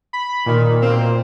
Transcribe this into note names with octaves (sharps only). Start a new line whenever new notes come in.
B5
A#2 D#3
B2 A#3 C4